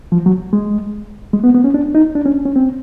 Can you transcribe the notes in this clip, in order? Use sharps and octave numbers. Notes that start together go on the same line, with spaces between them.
F3
F#3
G#3
G#3
B3
B3
C#4
D4
D#4
D4
C#4
C#4
C4